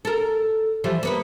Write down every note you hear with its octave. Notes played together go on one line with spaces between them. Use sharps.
A4 A#4
E3 F3 G3
A#3 B3 B4